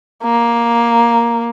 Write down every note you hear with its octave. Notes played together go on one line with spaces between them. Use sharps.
A#3